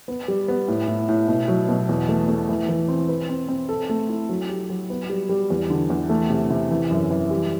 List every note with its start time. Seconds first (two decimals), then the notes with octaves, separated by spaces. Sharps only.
0.08 B3
0.28 G3
0.48 B3
0.68 A2
0.88 A2
1.09 A2
1.28 B2
1.48 F#3
1.69 B2
1.89 E2
2.09 A3
2.29 A3
2.49 E3
2.69 E3
2.88 C4
3.09 B4
3.29 C4
3.48 C4
3.69 A4
3.89 A3
4.09 E4
4.29 F#3
4.49 G4
4.70 F#3
4.90 B3
5.10 G3
5.29 G3
5.50 E2
5.70 D3
5.90 E2
6.09 A3
6.30 C3
6.50 C3
6.71 E3
6.91 F#2
7.11 E3
7.31 G3